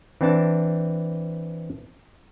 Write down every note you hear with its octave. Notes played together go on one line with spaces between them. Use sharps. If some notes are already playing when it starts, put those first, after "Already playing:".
E3 C4 D4 A5